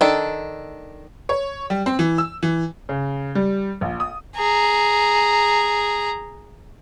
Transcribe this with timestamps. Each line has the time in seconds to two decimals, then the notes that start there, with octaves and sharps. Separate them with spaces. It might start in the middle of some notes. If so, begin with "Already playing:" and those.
0.01 D#3 D4 A4
1.29 C#5
1.70 G3
1.86 C4
1.99 E3
2.18 E6
2.43 E3
2.89 C#3
3.35 G3
3.81 A#1
4.00 D#6
4.36 G#4 A#5